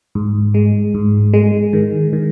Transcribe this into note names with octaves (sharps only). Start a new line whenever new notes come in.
G#2
G#3
G#2
G#3
D#3
D#3